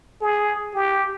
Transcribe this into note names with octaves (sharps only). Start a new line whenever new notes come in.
G#4
G4